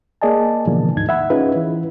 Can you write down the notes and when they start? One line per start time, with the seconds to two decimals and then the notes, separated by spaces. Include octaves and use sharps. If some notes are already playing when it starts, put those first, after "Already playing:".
0.22 A#3 G#4 D5 D#5 G#5 A5
0.67 B2 D3 E3 F3 A#3
0.96 D2 G#2 D#4 G#6
1.09 E5 F#5 B5
1.30 C#4 D#4 F4 G#4 B4
1.54 E3 E4 B4